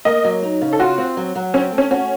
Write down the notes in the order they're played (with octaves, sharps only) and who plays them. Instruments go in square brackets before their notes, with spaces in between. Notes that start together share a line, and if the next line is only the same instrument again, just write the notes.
[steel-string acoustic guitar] A#3 [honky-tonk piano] D#5
[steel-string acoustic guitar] F#3
D#4
C#3
[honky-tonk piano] A4
[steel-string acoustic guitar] F4 [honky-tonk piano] F#4
[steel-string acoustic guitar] C4
F#3
F#3
[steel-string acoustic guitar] C4 [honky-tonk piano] C#4
[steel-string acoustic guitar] A3
[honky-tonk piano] C#4
[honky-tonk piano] C#4 [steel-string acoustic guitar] F#4